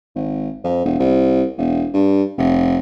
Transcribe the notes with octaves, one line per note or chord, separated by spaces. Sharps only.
G#1
F2
E1
C2
E1
G2
F1